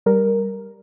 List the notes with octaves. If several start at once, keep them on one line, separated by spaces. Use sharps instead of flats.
G3 A#4